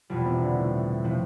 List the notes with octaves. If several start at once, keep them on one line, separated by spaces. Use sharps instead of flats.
E2 B2 F3 G3
C3
D3
A2
A2 C3 F3